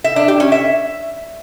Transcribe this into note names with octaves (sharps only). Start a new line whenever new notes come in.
E5
D4
G4
C#4
E5